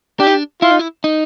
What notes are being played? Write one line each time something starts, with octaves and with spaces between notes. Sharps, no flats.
D4 G4
D#4
D4
E4 F4
D#4
E4
D#4